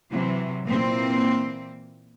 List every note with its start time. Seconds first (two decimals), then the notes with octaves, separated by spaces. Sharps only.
0.11 C3 E3 F#3
0.63 A#2 E3 A#3 C4